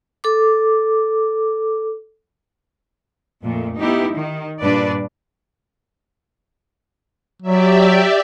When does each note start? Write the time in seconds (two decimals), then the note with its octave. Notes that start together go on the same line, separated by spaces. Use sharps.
0.24 A4 D6
3.42 F2 A#2 A3
3.77 B3 D#4 E4 G4
4.12 D#3
4.62 G2 A#2 D4 B4 D5
7.42 F#3 G4 D5 E5